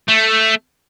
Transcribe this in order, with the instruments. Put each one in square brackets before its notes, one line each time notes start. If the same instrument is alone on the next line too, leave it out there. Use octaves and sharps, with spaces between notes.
[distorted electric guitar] A3